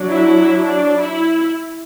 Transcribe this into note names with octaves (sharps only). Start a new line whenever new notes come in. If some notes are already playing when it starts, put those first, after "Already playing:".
Already playing: F#3 D4
E4
D4
E4